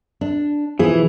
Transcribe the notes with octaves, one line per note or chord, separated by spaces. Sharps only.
D4
B2 E3 F3 G#4